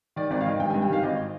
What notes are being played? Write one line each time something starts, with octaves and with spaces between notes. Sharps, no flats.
D#3 D5
G#1 D5
F5
D#3 D#5
G2 G5
G#5
G2
G5
D#3 F5
G#1 D#5